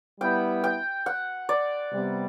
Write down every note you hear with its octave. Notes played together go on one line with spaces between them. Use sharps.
G3 B3 E4 G5
G5
F#5
D5
C3 G3 B3